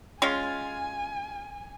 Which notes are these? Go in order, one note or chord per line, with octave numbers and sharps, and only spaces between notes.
G#3 C#4 F4 G#5